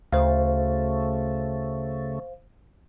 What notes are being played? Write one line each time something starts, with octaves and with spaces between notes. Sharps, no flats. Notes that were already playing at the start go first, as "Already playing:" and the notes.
D2 C#3 A3 C5 F5